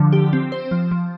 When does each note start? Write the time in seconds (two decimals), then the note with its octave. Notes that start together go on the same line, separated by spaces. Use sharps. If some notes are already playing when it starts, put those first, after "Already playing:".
Already playing: D3 F3
0.12 G4
0.33 C4
0.52 C5
0.71 F3
0.91 F3